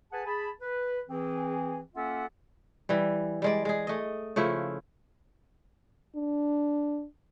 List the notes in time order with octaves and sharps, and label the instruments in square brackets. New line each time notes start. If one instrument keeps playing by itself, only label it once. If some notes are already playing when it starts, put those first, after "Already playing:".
[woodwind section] G#4 B4 F#5 G#5 A5
G#4 A5 B5
B4
E3 C4 G#4
A#3 C#4 F4 A4 E5 F#5
[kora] E3 G3
G3 G#3 D5
G#3 G#4
A3 D#5
C#3 F3 A3 E4
[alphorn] D4